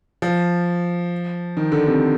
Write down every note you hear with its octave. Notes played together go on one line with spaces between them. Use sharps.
F3
D#3
D3
C3